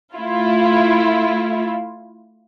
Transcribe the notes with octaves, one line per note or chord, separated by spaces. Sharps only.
A3 E4 F4